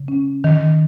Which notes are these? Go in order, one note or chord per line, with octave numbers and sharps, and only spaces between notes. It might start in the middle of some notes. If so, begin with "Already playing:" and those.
Already playing: C#3
C#4
D#3